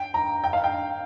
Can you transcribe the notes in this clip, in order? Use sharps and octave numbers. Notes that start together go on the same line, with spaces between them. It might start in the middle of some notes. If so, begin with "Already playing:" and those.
Already playing: G5
A#5
G5
F5
G5